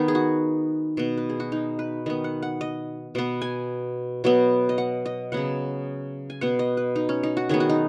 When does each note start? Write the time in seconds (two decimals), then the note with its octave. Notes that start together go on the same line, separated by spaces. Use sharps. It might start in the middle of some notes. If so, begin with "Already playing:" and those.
Already playing: D#3 B3 D#4
0.08 G#4
0.15 F#4
0.97 B2 B3
1.18 B4
1.29 G#4
1.40 F#4
1.52 D#4
1.79 B4
2.06 D#3 B3 D#5
2.24 F#5
2.42 F#5
2.61 D#5
3.15 B2 B3
3.42 G#5
4.24 B2 F#3 B3
4.69 D#5
4.78 F#5
5.06 D#5
5.32 C#3 F#3 B3 F#5
6.30 G#5
6.41 B2 B3 F#5
6.59 D#5
6.77 B4
6.96 D#4
7.09 C#4
7.23 D#4
7.37 F#4
7.49 D#3 F#3 B3 G#4
7.60 F#4
7.70 D#4